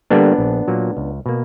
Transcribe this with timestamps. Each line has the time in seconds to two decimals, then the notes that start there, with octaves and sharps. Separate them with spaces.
0.10 D3 G3 A#3 B3 D4
0.38 A#1
0.68 A#2 F#3 A#3
0.97 C#2
1.26 B2 A#3